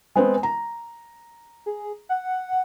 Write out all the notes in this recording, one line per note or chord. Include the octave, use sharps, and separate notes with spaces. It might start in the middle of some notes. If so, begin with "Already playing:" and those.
G#3 B3 C4
A#5
G#4
F#5